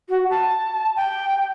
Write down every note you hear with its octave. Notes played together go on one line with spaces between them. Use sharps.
F#4
A5
G5